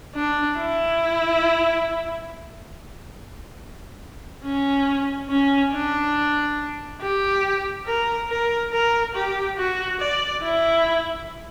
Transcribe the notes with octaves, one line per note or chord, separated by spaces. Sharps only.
D4
E4
C#4
C#4
D4
G4
A#4
A#4
A#4
G4
F#4
D5
E4